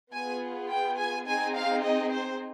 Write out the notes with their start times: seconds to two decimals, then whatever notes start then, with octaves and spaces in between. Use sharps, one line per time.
0.12 B3 F4 G#4 G#5
0.70 G5
0.98 G#5
1.26 C4 D#4 G#4 G#5
1.55 F5
1.84 D#5
2.12 C5